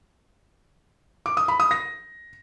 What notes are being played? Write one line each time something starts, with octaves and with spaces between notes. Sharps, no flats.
D6
D#6
B5
D#6
A#6